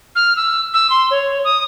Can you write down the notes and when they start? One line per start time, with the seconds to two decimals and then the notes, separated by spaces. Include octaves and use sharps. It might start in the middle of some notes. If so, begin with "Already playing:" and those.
0.15 F6
0.36 E6
0.74 E6
0.90 C6
1.11 C#5
1.44 D#6